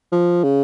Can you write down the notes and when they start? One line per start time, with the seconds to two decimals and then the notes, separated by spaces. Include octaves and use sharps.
0.12 F3
0.44 C#3